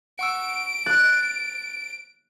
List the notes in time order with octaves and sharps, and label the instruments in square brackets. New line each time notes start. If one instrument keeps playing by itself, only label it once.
[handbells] F#5 C#6 E6 [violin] D7
[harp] F#6 [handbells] A6